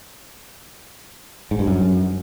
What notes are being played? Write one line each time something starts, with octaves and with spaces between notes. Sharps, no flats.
G#2
G2
F#2